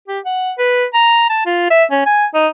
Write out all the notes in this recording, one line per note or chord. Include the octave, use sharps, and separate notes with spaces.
G4
F#5
B4
A#5
A5
F4
E5
C#4
G#5
D#4